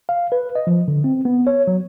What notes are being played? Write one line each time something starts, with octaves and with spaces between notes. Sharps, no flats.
F5
B4
D#5
F3
D3
C4
B3
C#5
F#3